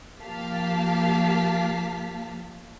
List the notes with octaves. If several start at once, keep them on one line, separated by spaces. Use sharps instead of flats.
F3 A#3 G4 F5 A5 B6